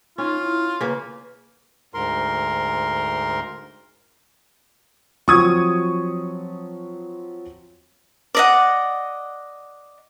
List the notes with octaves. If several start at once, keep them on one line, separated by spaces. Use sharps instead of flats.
C#4 D#4 F4
E4
C#3 A#3 B4
D2 G#2 A#4 C6
F3 F#3 C4 C#6 D#6 G#6
D5 D#5 F#5